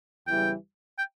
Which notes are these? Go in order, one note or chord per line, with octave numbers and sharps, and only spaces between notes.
E2 C#3 E3 G3 G5
G5